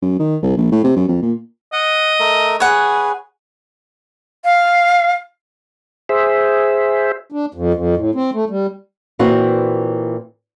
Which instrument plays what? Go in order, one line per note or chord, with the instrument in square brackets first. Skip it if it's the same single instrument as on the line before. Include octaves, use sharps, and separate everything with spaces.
[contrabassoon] F#2
D#3
C2
A#1
A2
C3
F#2
F2
A#2
[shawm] D#5 [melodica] F#5
[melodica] A3 A#4
[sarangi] G#4 [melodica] B4 [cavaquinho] C#5 F#5
[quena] F5
[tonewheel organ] G#4 C5 E5
[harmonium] D4
F2
F2
A2
C4
A3
G3
[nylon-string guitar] A#2 E3 C4 E4 F#4